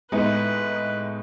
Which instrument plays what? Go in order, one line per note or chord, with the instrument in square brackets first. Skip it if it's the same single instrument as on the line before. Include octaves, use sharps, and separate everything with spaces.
[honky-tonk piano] A2 G#3 B3 D#4 [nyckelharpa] B4